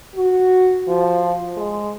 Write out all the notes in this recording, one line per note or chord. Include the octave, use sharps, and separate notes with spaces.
F#4
F3
G#3